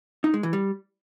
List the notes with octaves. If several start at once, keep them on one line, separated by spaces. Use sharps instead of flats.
D#4
G#3
E3
G3